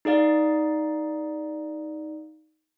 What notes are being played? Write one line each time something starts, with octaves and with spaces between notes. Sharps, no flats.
D#4 G#4 D5 F5